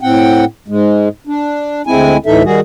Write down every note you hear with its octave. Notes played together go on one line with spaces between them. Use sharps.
A2 C4 F#5 G5
G#2 G#3
D4
D2 G#3 C4 E4 G#5
D2 A2 E3 D#4 A4 E5
D#3 G3 F#4 G#4